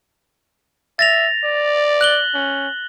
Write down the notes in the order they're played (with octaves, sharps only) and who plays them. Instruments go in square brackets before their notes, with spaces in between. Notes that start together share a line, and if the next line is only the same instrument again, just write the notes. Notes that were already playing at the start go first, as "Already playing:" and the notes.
[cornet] E5 [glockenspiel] A6 A#6 F7
[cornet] D5
[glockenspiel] F#6 F#7 G7
[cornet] C#4